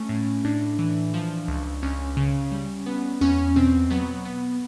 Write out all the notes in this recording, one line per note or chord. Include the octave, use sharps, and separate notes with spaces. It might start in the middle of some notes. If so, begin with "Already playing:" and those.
Already playing: A3 C#4
A2
A2 D4
E3
F3
C#2
C#2 C#4
C#3
G3
B3
E2 C#4
B2 C4
F#3 B3
B3